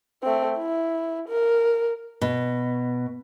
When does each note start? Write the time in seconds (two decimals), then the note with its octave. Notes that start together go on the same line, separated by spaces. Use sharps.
0.23 A3 C4
0.57 E4
1.28 A#4
2.21 B2